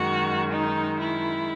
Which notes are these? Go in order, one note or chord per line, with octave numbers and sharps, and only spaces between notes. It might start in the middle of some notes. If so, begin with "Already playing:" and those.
Already playing: F#2 D#3 G#3 F#4
D#4
E4